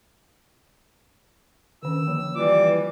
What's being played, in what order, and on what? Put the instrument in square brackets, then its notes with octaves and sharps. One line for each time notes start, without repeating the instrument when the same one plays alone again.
[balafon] D3 D#3 C#4 [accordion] E6
[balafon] D#3 F3 A#3
[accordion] E3 G3 D6 [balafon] F4